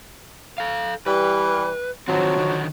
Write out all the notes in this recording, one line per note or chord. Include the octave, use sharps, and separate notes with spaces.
A4 F5
E3 G3 B4
D3 D#3 F3 F#3 C4
D3 D#3